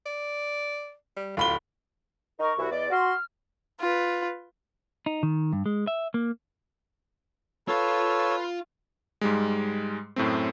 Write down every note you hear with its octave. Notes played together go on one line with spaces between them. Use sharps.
D5
G3
D1 F4 B5 G7
D#4 A#4 C#6
C2 E4 F#4
E2 D5 D#5
F#4 C6 F6
F4 B4
D#4
D#3
G2
G#3
E5
A#3
F4 A4 B4 C#5 F5 E6
G#2 G3 G#3
F#2 A2 A3 C4